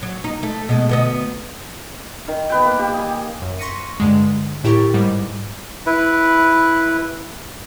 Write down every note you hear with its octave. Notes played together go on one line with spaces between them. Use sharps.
F#3
D#4
A3
B2 G#3
D2 B3 D#5
D#3
B3 B4 G5
A#3
G4
D#5 G#5
F#2
C6 C#6 A#6 B6 C#7 D#7
G2 D3 G#3
A2 E4 G4 A#4 C#6 A6
G#2 G3
E4 B4